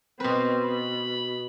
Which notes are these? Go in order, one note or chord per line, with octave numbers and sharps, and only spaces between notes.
B2 C4 B4
B5